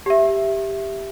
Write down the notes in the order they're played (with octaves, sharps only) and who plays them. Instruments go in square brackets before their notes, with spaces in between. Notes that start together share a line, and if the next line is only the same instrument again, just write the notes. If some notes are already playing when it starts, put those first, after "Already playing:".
[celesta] G4 E5